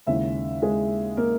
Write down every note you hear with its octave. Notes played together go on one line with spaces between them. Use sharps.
D#2 C#3 G#3 E4 E5
G#3 G#4
A#3 A#4